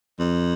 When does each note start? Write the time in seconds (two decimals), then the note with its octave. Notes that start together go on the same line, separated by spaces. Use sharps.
0.19 F2